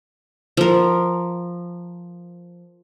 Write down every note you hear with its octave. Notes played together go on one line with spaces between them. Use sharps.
F3 A#4